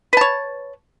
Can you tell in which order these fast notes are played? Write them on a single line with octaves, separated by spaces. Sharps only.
B4 A5 C#5